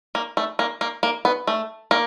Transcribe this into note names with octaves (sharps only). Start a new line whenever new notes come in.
A#3
A3
A#3
A#3
A#3
B3
A3
A#3